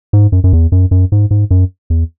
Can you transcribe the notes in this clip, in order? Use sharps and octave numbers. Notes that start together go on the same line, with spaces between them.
G#2
F#2
F#2
E2
F#2
F#2
G#2
G#2
F#2
E2